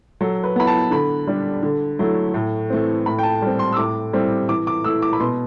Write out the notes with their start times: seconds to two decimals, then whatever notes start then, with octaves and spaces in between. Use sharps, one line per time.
0.21 F#3 A4
0.44 B4
0.56 B3 E4 B5
0.67 A5
0.91 D3 B5
1.27 G3 D4
1.63 D3
1.99 F#3 A3 E4
2.34 A2
2.70 E3 A3 C4
3.06 A2 B5
3.19 G5
3.23 A5
3.42 G3 C4
3.59 C6
3.73 E6
3.77 A2 D6
4.13 G3 C4 E4
4.49 E3 D6
4.67 D6
4.84 A3 E6
4.88 E4
5.02 D6
5.13 B5
5.20 B2 C6